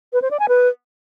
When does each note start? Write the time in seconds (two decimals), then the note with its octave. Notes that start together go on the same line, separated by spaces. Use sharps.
0.13 B4
0.22 C5
0.31 D5
0.40 G#5
0.48 B4